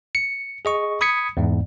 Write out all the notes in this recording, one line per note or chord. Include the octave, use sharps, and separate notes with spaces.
C#7
G#4 D#5 C#6
B5 D#6 G#6 B6 C#7
E2 G#2